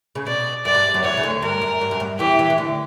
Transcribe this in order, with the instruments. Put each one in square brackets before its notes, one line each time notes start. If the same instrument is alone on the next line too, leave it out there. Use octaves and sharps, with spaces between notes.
[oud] C#3
[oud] B2 [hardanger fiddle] D5
[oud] F#2 [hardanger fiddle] D5
[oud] G2
F#2 F#3
[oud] E2 E3 [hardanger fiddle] C#5
[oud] C#3
D2 D3
[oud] G2 [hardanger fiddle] A#4
[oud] F#2
G2
F#2
G2
[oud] E2 E3 [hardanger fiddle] G4
[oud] E2 E3
E3
D2 D3